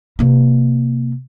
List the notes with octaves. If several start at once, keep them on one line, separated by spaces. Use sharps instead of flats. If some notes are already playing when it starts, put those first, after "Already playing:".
C3 A#3